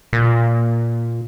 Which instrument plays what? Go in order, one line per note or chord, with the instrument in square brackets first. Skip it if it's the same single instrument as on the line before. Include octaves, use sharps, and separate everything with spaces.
[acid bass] A#2